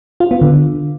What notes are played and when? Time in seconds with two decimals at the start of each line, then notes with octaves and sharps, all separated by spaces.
0.20 F4
0.31 B3
0.41 D3